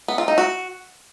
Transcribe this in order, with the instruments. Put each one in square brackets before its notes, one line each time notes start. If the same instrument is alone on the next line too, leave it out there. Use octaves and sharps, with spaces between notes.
[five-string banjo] B3
F4
D#4
F#4